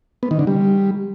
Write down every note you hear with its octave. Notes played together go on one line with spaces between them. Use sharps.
B3
D#3
D3
G3